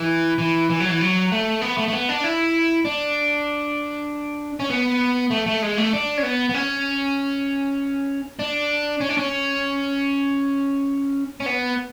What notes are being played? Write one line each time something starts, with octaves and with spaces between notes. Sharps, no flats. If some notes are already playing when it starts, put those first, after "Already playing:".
Already playing: E3
E3
E3
F#3
E3
F#3
A3
B3
A3
A3
B3
D4
E4
D4
C#4
B3
A3
A3
G#3
A3
D4
C#4
B3
B3
C#4
D4
C#4
D4
C#4
C#4
B3